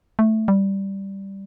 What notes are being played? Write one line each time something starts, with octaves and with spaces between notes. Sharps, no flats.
A3
G3